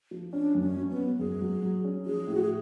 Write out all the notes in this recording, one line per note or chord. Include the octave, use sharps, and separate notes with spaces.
F3
C#4 D4
F#2
C#4
F#3
B3
C#4
F#2 G#4
F#3
F#3
C#4
F3 G#4
A2
F#4
G#4